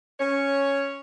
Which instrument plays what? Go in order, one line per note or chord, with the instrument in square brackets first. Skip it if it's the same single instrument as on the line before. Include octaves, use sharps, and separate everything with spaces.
[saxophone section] C#4 C#5